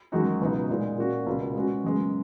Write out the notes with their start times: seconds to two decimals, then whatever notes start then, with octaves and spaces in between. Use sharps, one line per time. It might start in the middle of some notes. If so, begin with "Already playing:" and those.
0.12 F#2 D#3 G#3 D#4 F#4
0.41 C#2 B2 F#3 B3 D#4
0.69 A#2 G#3 D#4
0.98 A#2 A#3 C#4 F#4
1.26 C#2 B2 A#3
1.55 B2 G#3 C#4 F#4
1.84 F#2 C#3 G#3 B3